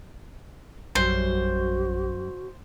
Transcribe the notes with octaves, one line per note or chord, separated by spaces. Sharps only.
A#1 F#2 G3 F#4 C5